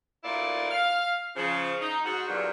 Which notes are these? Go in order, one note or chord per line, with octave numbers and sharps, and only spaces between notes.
D2 A#2 A#3 E4 D5
F5
C#3 F3
D#4
G#2 F#4
E2 G2 A#2 D3 F#3